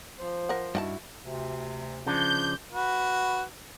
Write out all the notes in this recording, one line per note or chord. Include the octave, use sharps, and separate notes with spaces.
F3 C5
A#4 F#5
G2 D#3 E4 F#4 F#5 A5
D2 C3
C#3 F3 D4 G6
F#4 B4